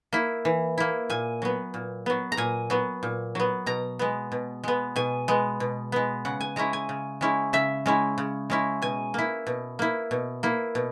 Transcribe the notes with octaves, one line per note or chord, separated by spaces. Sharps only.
A#3 E4
E3
A#3 E4
A#2 G#5
F#3 B3
A#2
F#3 B3
A#5
A#2 G#5
F#3 B3
A#2
F#3 B3
B2 A#5
G#3 B3
B2
G#3 B3
B2 G#5
G#3 B3
B2
G#3 B3
C#3 F#5
G#5
G#3 C#4 E4 A#5
G#5
C#3
G#3 C#4 E4
C#3 E5
G#3 C#4 E4
C#3
G#3 C#4 E4
B2 G#5
A#3 E4
B2
A#3 E4
B2
A#3 E4
B2